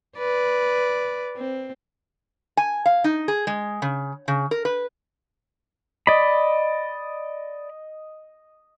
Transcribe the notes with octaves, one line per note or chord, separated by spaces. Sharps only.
B4 D5
C4
G#5
F5
D#4
G#4
G#3
C#3
C#3
A#4
B4
D5 D#5 B5